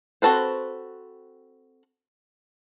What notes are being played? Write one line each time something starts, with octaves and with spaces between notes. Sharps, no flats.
C4 F#4 A4 B4 C5